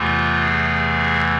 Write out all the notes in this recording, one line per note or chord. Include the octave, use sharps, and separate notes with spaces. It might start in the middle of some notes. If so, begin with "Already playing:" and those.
Already playing: E2 C3 E3 A3 F4
G#4